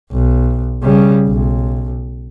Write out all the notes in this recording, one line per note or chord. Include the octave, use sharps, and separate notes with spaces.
B1
C#3 G3
B1